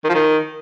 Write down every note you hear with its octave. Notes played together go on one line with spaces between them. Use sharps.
D#3
F3
D#3